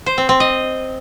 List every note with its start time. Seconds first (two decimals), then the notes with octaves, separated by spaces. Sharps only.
0.06 C5
0.18 C4
0.29 C4
0.40 D#5